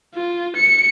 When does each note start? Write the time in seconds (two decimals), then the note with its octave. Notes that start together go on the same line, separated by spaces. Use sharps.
0.14 F4
0.56 C#7